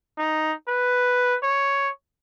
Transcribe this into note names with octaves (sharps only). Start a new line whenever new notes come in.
D#4
B4
C#5